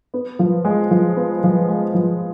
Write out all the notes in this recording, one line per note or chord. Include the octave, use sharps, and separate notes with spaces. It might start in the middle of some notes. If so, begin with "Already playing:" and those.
B3
F3
G#3
F3
B3
F3
G#3
F3